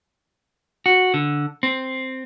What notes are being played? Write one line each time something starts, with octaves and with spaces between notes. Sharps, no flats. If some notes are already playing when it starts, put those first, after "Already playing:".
F#4
D3
C4